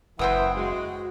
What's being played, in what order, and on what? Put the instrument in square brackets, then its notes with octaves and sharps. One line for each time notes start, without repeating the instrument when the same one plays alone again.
[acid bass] F#1 [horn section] E3 [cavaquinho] C5 G5 D#6 [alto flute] F#5
[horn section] G#3 [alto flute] F#4